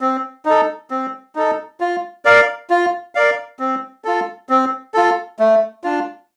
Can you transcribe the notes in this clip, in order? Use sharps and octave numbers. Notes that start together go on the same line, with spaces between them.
C4
D#4 A4
C4
D#4 A4
F4
A#4 D5 F5
F4
A#4 D5 F5
C4
F4 A4
C4
F4 A4
A3
D4 F4